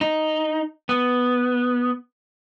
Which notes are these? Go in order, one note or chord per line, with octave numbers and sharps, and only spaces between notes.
D#4
B3